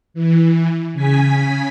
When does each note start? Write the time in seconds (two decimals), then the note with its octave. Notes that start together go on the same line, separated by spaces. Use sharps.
0.14 E3
0.93 C#3 G#5 B6